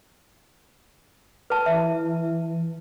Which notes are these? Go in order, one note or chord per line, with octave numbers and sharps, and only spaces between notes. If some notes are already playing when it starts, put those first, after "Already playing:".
B4 A5
E3 E5